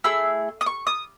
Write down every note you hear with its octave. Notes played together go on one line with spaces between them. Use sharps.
A3 E4 G#4 E6
D#6
C#6
D#6